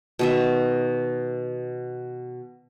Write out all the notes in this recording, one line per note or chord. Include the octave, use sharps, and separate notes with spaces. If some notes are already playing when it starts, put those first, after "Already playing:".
B2 D#3 E5